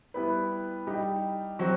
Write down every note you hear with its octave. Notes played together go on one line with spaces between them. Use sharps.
G3 B3 E4 B4
G3 D#4 G4
F#3 C4 F#4